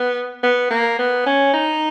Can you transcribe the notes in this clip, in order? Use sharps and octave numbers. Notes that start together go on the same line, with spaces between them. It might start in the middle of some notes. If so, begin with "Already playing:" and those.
Already playing: B3
B3
A#3
B3
C#4
D#4